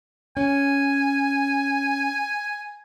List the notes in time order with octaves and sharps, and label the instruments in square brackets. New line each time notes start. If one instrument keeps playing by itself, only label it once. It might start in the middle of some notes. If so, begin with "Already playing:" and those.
[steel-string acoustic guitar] C#4 [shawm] G#5